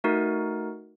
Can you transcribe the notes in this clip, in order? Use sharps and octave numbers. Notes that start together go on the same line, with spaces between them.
A3 D#4 F#4 A#4